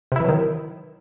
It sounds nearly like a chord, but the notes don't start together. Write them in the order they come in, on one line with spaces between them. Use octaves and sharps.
C3 E4 E3 F#3 D#3